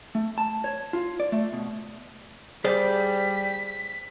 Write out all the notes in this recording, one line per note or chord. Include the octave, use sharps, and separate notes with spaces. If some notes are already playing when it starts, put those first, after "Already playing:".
A3
A5
C#5
F4
D5
A3
B2
G3 G#4 C5 D5 B6